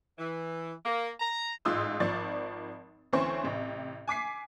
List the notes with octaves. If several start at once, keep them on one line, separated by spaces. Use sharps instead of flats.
E3
A#3
A#5
A1 G#2 F4 C6 D#6 E6
G#1 F3 D5 C#6 A6
D2 E3 C4 C#4 C5 C#6
A1 C3
G#5 D6 B6 C7